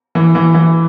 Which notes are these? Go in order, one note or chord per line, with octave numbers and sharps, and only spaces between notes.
E3
E3
E3